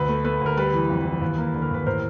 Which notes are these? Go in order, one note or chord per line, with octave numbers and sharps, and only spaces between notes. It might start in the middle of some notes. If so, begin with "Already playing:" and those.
Already playing: D2 B4
A3
A3 B4
D2 A#4
G3 B4
E3
F2
E3
D#2
A#3
D3
A#4
D#2 B4
A2 A#4 C5